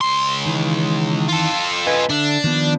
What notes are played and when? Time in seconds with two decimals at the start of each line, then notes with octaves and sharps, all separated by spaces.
0.01 C#2 C6
0.45 D#3 E3
1.28 F4 A4
1.87 B4 D#5 G#5
2.09 D3 D4 E5
2.44 D#3 F3 B3